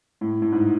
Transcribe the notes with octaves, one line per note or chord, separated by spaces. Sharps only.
A2
A2
G#2